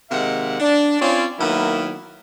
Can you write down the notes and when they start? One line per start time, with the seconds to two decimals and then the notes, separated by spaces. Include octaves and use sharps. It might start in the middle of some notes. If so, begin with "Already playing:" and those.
0.11 C3 D#3 G#3 A#3 E5 F#5
0.60 D4
1.00 C4 C#4 F4 C#5 D5
1.38 D#3 F#3 A#3 B3 E4